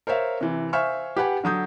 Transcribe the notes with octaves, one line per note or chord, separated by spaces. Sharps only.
A#4 C5 C#5 E5 F5
C3 E3
C5 E5 F5 G#5 C#6 F6
G4 B4 F#5 G#5
D3 F#3 D#6 G6